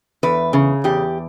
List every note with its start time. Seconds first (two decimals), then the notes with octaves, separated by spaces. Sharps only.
0.23 E2 B4
0.53 C#3
0.84 E2 G4